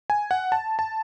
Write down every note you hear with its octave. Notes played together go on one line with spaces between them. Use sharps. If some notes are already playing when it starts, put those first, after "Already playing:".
G#5
F#5
A5
A5